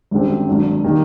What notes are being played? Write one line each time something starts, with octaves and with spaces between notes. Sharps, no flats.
G#1 F#2 D3 G3 C4
G#1 G2 D3 F#3
D#3 G3 A#3 D#4